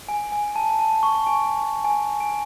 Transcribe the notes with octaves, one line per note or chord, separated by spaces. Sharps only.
G#5
G#5
A5
A5
C#6
G#5
G#5
G#5